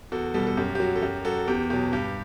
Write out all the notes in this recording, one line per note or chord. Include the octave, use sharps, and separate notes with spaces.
E2 F#4 A4
B2 G3 F#4 A4
A4
F#2 G4
G4
F#3 F#4
A4
F#2 G4
F#3 F#4 A4
E2 G4
B2 F#3 G4
G2 G4